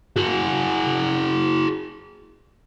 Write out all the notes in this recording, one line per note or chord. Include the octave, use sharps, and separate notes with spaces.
F#4 G#4